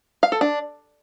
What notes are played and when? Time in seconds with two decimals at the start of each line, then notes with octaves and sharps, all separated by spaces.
0.23 F5
0.32 A4
0.41 D4